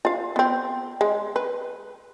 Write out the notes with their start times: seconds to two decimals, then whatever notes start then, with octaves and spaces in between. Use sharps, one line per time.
0.05 F4 F5
0.36 B3 C4
1.01 G#3
1.36 B4